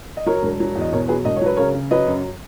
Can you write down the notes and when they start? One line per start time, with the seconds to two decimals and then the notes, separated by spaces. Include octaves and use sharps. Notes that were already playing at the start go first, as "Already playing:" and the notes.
0.17 D#5
0.26 F#3 A#4 C#5
0.43 E1
0.60 F#3
0.75 E2
0.81 D#5
0.92 B2 A#4 C#5
1.08 F#3 G#4 B4
1.25 E1 D#5
1.36 C#5
1.41 F#3 B4
1.56 C#3 A#4 C#5
1.75 C#3
1.91 F#3 B4 D#5
2.07 F#2